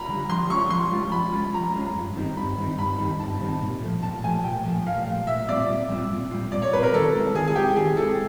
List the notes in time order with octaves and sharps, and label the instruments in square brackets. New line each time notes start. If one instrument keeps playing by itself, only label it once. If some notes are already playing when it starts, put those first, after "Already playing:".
Already playing: [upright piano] A#5 B5
[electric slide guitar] D3 G3
[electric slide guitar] F3 [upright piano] C6
[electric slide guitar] G#3 C#4 F4 [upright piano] C#6
[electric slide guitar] F3 [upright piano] C6
[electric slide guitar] G#3 C#4 F4
[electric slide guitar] F3 [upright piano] B5
[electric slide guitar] G#3 C#4 F4
[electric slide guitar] F3 [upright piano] A#5
[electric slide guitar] G#3 C#4 F4
G2
D#3 G3 C4 D#4
[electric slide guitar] G2 [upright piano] B5
[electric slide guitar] D#3 G3 C4 D#4
[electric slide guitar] G2 [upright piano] B5
[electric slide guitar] D#3 G3 C4 D#4
[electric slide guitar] G2 [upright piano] A5
[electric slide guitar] D#3 G3 C4 D#4
A#2
F3 A3
[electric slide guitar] A#2 [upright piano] A5
[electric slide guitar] F3 A3 [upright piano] G#5
[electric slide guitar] A#2 [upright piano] G5
[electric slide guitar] F3 A3
[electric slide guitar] A#2 [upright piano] F5
[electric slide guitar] F3 A3
[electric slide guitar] A#2 [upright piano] E5
[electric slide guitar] G3 C4 F4 [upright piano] D5
[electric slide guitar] A#2
G3 C4 F4
A#2
G3 C4 F4
[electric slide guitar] A#2 [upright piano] D5
[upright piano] C#5
[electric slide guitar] G3 C4 F4 [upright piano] B4
[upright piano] A#4
[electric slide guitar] D#3 [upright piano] A4
[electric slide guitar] G#3 C4 E4
[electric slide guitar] D#3 [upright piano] G#4
[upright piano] G#4
[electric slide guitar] G#3 C4 E4 [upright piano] G4
[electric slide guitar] D#3 [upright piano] G#4
[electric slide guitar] G#3 C4 E4 [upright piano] A4